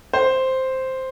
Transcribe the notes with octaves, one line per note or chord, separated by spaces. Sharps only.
C5